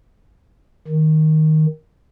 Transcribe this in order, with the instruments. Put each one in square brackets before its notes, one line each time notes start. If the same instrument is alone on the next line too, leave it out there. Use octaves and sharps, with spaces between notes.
[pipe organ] D#3